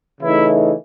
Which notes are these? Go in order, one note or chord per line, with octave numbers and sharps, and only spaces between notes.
C#3 E3 A3 D#4 E4